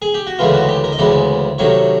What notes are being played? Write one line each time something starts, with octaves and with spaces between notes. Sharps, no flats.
G#4
G4
F#4
D2 C#3 E3 G#3 B3 F4
F#4
G4
A#4
D#5
D2 C#3 E3 G#3 B3 D5
C3 D#3 F#3 A3 C#5